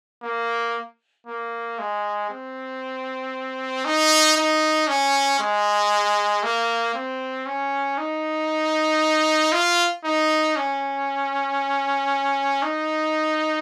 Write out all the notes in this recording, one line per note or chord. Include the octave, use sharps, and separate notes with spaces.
A#3
A#3
G#3
C4
D#4
D#4
C#4
G#3
A#3
C4
C#4
D#4
F4
D#4
C#4
D#4